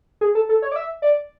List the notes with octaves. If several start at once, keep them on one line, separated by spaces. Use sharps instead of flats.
G#4
A4
A4
C#5
D5
E5
D5